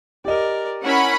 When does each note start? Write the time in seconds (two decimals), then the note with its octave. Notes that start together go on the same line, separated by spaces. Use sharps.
0.25 G4 A#4 D5 D#5
0.84 C#4 E4 A#4 F#5 B5